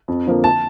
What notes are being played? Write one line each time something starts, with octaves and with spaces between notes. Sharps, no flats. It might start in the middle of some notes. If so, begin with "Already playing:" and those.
F2
D3 F3 A#3
A5